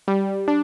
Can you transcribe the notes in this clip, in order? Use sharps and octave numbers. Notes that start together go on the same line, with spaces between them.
G3
D4